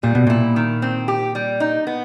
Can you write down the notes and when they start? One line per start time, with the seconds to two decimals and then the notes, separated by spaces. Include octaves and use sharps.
0.03 A#2 G3
0.15 B2
0.27 A#2 E4
0.56 D#3
0.82 C4
1.08 G4
1.35 G3
1.60 D#4
1.87 B3